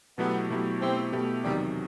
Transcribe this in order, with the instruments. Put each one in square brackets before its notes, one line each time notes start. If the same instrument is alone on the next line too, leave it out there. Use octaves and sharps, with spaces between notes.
[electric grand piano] B2 F#3 A3 E4 G4 [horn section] B3
[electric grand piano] B2 F#3 A3 E4 G4
[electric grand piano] B2 A3 E4 G4 [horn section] C4
[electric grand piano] B2 A3 E4 G4
[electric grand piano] E2 C3 D#3 F#3 [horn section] G3